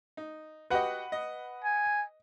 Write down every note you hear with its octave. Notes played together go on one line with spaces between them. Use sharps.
D#4
F#4 G4 B4 D#5 F#5
D#5
G#5